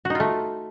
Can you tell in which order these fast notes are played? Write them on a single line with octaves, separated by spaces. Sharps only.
F#4 D#4 F4 A3